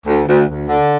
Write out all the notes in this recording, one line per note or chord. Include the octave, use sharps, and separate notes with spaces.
D2
D2
D2
D3